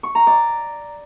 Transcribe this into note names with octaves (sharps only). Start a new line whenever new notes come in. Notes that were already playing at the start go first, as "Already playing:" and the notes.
C#6
A#5
D5